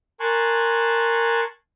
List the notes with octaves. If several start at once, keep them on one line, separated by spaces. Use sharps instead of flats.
A#4 G#5 A5 C6 C#6 F#6